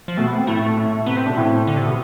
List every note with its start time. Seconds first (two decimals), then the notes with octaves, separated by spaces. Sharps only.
0.08 F3
0.17 B2 A3
0.27 B3
0.38 C4
0.47 A2 A3
0.77 A2
1.06 C3 B3
1.17 C4
1.26 B2 D4
1.37 A2 C4
1.67 D3
1.77 C3
1.86 B2